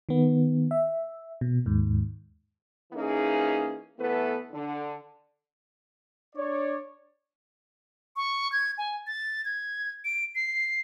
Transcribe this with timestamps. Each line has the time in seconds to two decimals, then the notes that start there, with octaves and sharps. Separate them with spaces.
0.09 D#3 B3
0.71 E5
1.41 B2
1.66 D#2 G#2
2.93 E3 A#3 C#4 D#4 G#4
3.97 E3 A3 B3 A4 B4
4.51 D3
6.36 D4 C#5 D5
8.16 C#6
8.52 G#6
8.78 G#5
9.07 A6
9.45 G#6
10.05 D7
10.35 C7